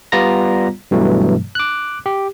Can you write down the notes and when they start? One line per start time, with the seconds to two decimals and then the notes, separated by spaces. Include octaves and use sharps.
0.12 G3 B3 F4 D5 A#5 A#6
0.91 G2 B2 E3 F#3 A3
1.55 D6 F#6
2.06 G4